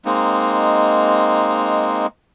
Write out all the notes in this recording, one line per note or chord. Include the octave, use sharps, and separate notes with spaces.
G#3 A#3 C4 D#4